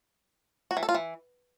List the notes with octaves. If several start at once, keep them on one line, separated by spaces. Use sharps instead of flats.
F#4
E3
A4
F4
E3